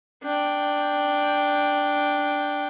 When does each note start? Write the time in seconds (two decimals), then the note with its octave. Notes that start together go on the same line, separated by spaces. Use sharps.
0.23 D4 G5